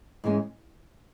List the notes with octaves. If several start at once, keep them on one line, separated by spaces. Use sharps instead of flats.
G#2 E3 G#3 C#4